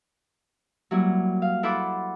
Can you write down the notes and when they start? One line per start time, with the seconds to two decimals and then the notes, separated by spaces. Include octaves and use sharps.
0.91 F#3 G3 A#3 E4
1.42 F5
1.63 E4 A4 C5 F#5 B5 D6